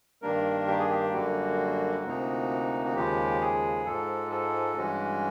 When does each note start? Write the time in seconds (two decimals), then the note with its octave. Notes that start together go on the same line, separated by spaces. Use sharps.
0.22 G2 D#3 G3 A#3 D4 A#4
0.67 G4
0.79 G#4
0.89 G4
1.13 F#2 D3 G3 A#3 F#4
2.04 D2 C3 F3 A#3 D#4
2.85 F#4
2.95 D#2 C#3 F3 G#3 G4
3.41 G#4
3.85 G#2 F3 G#3 A4
4.31 A4
4.77 G2 E3 G#3 C#4 F#4